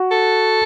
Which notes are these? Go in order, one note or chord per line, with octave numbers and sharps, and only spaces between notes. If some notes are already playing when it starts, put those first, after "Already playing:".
Already playing: F#4
A4